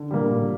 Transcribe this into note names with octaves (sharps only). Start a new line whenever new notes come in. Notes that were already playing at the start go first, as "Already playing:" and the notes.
Already playing: D3
A#2 G3 A#3
A2